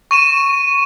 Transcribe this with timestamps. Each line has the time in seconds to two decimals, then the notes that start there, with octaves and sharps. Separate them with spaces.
0.11 C#6 D#7 E7